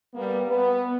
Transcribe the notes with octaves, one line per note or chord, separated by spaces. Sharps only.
G3 A#3 B3
B3